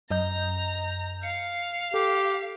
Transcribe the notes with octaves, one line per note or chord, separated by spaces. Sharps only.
F#2 D#5 A#5 G6
F5 C#7
G4 A4